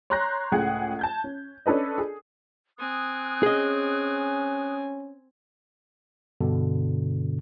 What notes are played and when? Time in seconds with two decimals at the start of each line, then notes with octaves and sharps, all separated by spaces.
0.10 C#5 A#5 C6 F#6 G6 A#6
0.52 C#2 A2 G#4 F#5 G5 G#6
0.99 A5 G6 G#6
1.24 C#4
1.66 C#4 D4 A4 B4 D#5
1.98 G#4
2.79 C4 G#5 D#6 F#6
3.43 C#4 G#4 D#5
6.41 G2 B2 D3